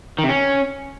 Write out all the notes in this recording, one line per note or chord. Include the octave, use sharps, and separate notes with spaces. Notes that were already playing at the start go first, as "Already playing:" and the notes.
D#3
C3
C#4